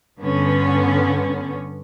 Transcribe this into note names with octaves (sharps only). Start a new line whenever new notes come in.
G2 D3 B3 C#4